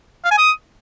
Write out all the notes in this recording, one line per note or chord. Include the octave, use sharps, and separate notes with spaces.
F5
G#5
D#6